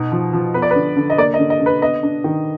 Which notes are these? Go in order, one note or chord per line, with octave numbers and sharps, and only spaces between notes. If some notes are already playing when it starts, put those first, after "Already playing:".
Already playing: B2 D#4
F3
F3
B3 B4
D5
D3 B4
D3
D#5
A#3 D5
D#5
D3
D#5
D3
B4
B3 D#5
D4
D#3